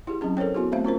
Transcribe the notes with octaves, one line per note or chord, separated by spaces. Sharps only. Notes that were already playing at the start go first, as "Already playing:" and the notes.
E4 G4 G#4
F#3 C4 C#4 G#4
A4 A#4 C5 C#5 G5
B3 E4 F#4 G#4
A3 C4 C5 E5 F5
C#4 F4 A#4 C5